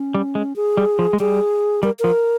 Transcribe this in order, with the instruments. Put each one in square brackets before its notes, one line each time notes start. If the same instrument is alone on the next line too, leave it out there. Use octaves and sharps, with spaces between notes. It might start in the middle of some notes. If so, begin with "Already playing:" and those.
Already playing: [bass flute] C#4
[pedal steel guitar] G3
G#3
[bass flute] G#4
[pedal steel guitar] G3
F3
G#3
[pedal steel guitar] G3 [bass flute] G#4
[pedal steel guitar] G3 [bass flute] A#4
[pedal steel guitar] F3 [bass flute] A#4